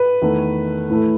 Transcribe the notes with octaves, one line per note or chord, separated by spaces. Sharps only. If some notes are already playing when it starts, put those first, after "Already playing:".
Already playing: B4
E2 D#3 A3
A2 E3 A3